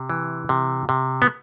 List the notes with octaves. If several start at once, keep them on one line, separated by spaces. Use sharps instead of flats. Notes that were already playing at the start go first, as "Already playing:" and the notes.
Already playing: C3
E3
C3
C3
B3